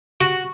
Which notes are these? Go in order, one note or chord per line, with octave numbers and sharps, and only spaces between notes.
F#4